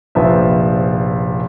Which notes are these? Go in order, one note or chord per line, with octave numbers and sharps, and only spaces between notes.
F1 A#1 F3 B4 E5